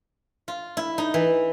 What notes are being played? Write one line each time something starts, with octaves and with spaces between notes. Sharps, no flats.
F4
E4
D#4
E3